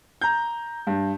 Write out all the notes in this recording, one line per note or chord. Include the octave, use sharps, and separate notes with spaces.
A#5 G6
G2